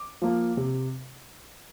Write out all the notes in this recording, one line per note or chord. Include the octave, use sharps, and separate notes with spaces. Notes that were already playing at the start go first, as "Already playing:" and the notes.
Already playing: D6
F3 A#3
C3